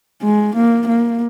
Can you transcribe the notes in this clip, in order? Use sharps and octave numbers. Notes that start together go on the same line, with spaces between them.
G#3
A#3
A#3